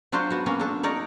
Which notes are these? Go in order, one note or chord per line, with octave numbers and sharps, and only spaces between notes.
F#3 D4 F4 F#4 C5
B3 F#4
A#3 B3 C#4 F#4
D4 A4
D#4 A#4 C#5 D5